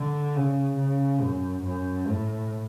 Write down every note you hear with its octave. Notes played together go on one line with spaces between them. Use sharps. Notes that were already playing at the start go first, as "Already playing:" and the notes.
Already playing: D3
C#3
C#3
F#2
F#2
A2